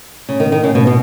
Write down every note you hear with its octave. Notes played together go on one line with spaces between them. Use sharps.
C#3
D#3
D#3
C#3
B2
B2